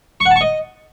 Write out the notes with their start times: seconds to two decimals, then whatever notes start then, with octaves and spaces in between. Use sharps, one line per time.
0.20 C#6
0.25 F#5
0.31 A5
0.36 C#6
0.41 D#5